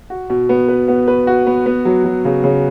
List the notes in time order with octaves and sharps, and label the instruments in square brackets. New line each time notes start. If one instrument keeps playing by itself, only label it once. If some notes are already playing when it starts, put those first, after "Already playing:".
[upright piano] F#4
B2
B3
B4
B3
B4
F#4
B3
B3
F#3
F#3
C#3
C#3